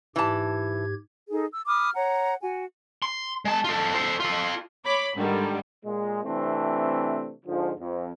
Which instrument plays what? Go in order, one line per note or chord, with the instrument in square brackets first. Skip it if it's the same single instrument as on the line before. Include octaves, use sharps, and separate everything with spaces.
[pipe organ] G#2 G4 G#6 [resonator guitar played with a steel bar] E3 A5
[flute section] D#4 G#4 A4
E6
B5 D6 D#6 F6
C#5 F#5 A#5
F#4 G#5
[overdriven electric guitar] C6
G#3 A5
F4 A4
A4 C5
F4 A4
[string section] C#5 B5 D6
G#2 D3 D#3 G3
[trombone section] A#2 G#3
C3 E3 A3 C4 D4
G#2 D3 F3
F2